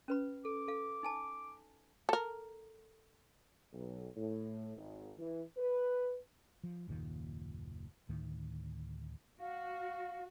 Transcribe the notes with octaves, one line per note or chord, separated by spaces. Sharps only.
C#4 B4 B5
A4 D6
A4 F5
D#4 G#5 A5
A4 A#4
B1
A2
G#1
E3
B4
F3
F#1 D#2 A#2 D#3
D2 A2 D#3
F#4 F5